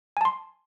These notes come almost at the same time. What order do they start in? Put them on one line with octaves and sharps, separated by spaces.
G#5 A5 C6